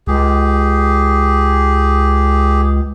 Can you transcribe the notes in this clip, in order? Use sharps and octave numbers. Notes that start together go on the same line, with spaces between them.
C#2 G4 G#4